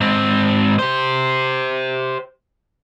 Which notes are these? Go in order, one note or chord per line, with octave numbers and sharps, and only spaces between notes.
G#2 C4
G4 C5